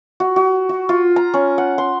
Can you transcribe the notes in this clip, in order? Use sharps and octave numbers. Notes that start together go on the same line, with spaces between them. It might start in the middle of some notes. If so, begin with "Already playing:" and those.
F#4
F#4
F#4
F4
A#5
C#4
F#5
C6